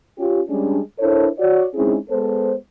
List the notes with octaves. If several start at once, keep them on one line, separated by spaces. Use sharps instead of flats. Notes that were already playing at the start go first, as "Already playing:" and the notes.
C#4 F4 G4
G3 G#3 C#4 D4
D4 E4 A4 A#4 C5 C#5
F#4 C#5 D5
G#3 C4 C#4 D#4 E4 G#4
G#3 B3 A4 C5